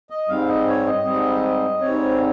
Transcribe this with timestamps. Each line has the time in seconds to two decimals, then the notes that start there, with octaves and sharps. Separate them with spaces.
0.10 D#5
0.29 G#2 G3 C4 F5
0.48 D#5
0.68 C#5
0.86 D#5
1.05 G#2 G3 C4
1.81 G#2 G3 C4 C#5